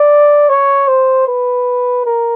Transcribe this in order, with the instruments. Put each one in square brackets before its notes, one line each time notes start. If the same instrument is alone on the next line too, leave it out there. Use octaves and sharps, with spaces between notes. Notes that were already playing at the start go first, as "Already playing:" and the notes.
Already playing: [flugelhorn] D5
C#5
C5
B4
A#4